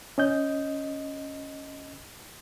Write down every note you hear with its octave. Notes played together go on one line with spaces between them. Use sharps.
C#4 D#5 G6